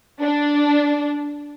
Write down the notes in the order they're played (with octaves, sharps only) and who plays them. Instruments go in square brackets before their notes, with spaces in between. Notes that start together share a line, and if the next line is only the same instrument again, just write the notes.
[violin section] D4